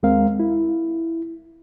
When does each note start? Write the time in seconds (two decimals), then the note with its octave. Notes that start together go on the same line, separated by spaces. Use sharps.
0.03 D#2 G#3 C4 A#4 F5
0.39 E4